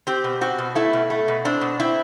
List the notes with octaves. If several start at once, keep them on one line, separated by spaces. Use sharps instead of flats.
C4 G4
B2
C4 F#4
B2
A3 E4
B2
A3
B2
C4 D4
B2
C4 E4